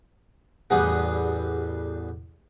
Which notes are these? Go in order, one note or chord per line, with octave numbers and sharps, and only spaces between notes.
A1 E2 G3 B3 G#4 F#5